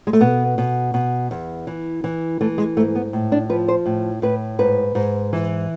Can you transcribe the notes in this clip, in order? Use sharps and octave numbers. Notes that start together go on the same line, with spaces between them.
G#3
A3
B2 B3
B2
B2
E2
E3
E3
E3 A3
G#3
G#2 A3
B3
A2
D4
F3 B4
C5
A2
A2 B4
G#2 B4
G#2
E3